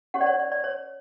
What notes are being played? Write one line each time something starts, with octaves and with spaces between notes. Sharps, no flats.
C#4 G4 C#5 F#5
D5
C#5
D5
D5
C#5